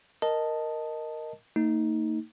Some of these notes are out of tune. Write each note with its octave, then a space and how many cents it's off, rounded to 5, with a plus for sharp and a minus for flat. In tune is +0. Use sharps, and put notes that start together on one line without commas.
A#4 +0 D#5 +0 A5 +0
A#3 -45 D#4 +15